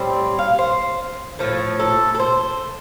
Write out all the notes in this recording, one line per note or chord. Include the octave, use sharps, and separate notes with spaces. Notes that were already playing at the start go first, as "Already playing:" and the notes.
Already playing: A2 G3 C4
F5
C5
A2 F3 A3
A4
A4
C5